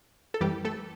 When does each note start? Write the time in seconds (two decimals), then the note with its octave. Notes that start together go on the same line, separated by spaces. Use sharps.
0.34 A4
0.41 F#2 E3 G3 G4
0.65 A3 A4